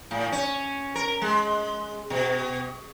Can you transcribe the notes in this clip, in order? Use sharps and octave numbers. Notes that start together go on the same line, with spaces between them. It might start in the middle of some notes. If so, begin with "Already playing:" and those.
A2
C#4
A#4
G#3
B2